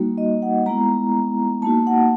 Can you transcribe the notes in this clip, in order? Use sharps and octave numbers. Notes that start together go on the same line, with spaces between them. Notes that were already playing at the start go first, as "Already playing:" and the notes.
Already playing: G3 A#3 D#4 F#4
D#5
F#5
G#3 B3 E4 A#5
A#3 D#4 F#4 A5
F#5